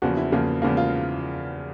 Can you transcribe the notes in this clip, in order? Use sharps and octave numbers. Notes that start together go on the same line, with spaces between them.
E2 C#3 F3 A#3 F#4
E4
E2 C#3 F3 A#3
E2 C#3 F3 A#3
F4